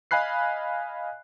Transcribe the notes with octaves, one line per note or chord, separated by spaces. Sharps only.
D#5 F5 G#5 B5 F#6 C7